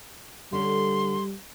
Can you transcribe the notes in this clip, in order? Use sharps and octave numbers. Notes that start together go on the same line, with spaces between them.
D3 G3 C#4 C6